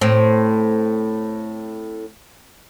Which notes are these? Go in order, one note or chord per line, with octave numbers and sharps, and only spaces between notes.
A2 C4